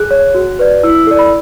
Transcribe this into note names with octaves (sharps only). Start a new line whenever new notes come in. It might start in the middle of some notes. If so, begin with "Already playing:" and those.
Already playing: G#4 F#6
C#5
F#4
B4 D5
E4 E6
E6
A4 D5
B5